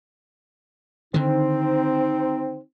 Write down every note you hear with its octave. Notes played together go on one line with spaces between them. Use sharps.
D3 D#3 C4 D#4